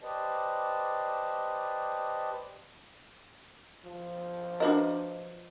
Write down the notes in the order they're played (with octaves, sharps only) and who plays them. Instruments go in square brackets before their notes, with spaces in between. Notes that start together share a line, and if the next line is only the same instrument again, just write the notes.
[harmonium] G4 B4 C5 D5 D#5 A5
[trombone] F3
[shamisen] D4 F#4 A#4 [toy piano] F4 B4 D#5